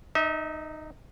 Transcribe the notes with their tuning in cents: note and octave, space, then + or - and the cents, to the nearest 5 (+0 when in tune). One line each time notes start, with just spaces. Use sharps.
D#4 -15 E5 -45